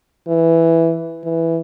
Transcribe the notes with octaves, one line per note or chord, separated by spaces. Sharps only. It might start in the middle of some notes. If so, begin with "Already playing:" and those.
E3
E3